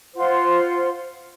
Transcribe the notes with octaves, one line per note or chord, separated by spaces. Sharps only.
F4 C5 F#5 C6